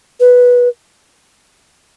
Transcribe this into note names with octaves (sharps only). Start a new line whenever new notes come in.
B4